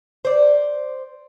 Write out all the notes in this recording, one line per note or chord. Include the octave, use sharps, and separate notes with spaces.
C5 D5